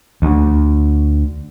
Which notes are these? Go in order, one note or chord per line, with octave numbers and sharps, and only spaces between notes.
D2